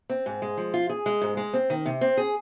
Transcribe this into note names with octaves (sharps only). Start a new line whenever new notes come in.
C4
G#2
G#3
F3
F4
G#4
G#3
G#2
G#3
C4
D#3
C3
C4
G#4